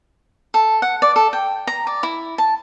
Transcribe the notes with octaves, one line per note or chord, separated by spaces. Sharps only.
A4
F#5
D5
A4
G5
A#5
D5
E4
A5